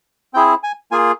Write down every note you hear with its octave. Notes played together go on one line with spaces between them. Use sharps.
C4 E4 G#4 G5
G#5
A#3 F4 G#4 G#5